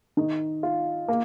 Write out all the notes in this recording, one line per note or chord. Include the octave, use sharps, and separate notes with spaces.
D#3
F4
A#3